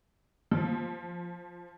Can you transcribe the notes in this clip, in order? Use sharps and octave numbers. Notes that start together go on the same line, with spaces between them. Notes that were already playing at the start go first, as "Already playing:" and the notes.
F3